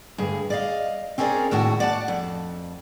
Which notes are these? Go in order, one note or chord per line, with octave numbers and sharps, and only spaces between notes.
D2 G2 G#4
D5 D#5 F5
C4 C#4 G#4 A#4 D5
D#2 A2 F#4 A5
D5 F#5 A5
F2